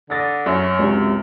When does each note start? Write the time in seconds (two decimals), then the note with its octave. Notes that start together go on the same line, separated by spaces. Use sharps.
0.10 D3 D#6 A6 A#6
0.46 F#2 C#5
0.79 C#2 C3